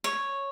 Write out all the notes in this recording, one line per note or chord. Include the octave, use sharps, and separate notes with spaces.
C#5